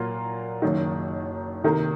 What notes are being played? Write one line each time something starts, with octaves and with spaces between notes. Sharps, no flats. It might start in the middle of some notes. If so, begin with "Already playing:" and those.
Already playing: A#2 F#3 A#3 F4
F#1 F#2 D#3
C3 D#3 A#3